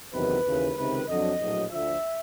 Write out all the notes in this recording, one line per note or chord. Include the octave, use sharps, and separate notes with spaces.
F#1 E2 C3 D#3 F#3 B4
D#2 C#3 E3
C#2 C3 D#3 B4
F2 D3 F#3 D#5
A#1 A2 F#3
D2 D3 F3 E5